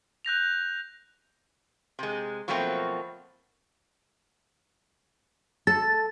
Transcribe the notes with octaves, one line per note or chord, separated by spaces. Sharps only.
F#6 G6 A#6 F7
C3 G#3
B2 F3 F#3 A3 A#3 C4
A4 A6